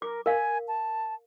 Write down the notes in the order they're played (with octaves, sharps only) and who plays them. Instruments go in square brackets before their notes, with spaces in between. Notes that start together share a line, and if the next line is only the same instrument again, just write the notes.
[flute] A#4 [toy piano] D6
[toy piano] A#4 F5 [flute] G#5
[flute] A5